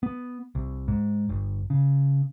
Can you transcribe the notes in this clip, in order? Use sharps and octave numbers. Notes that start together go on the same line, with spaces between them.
B3
C2
G#2
G1
C#3